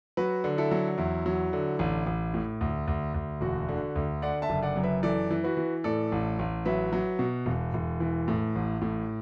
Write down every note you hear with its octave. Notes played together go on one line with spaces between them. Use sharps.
F#3 F#4 B4
D3
E4 A4
F#3
E2 E4
F#3
D3
A1
A1
A2
D2
D2
D2
E1 F#4
D3
D2
D3 D5 F#5
E5 A5
F#1
D5 F#5
F#2
B4 E5
E3 A4 D5
E3
F#4 B4
E3
A2 A4 D5
A1
A1
F#3 B4 E5
F#3
B2
E1
E1
E3
A2
A1
A2